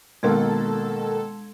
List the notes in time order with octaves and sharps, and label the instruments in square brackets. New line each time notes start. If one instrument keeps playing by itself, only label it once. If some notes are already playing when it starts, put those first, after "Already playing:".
[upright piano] B2 D#3 A#3 [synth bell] G#3 C6 G#6 [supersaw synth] A4